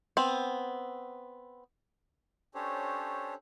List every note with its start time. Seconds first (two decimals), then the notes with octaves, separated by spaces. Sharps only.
0.17 B3 C4
2.55 C#4 D4 G4 A4 C5 C#5